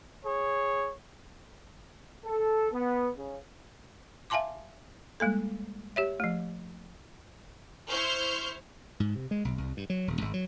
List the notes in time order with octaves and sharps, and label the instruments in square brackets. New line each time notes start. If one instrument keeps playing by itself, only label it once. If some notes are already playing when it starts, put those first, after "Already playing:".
[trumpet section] G#4 C#5
[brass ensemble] A4
B3
C#3
[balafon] E5 F5 G#5 A5 C6 D6
G3 G#3 A#3 A4
G4 C#5 E5
F3 A3
[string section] E4 C5 C#6 F6 G6
[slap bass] G#2
C3
G#3
B1
C2
G2
F#3
D#1
G#1
F#3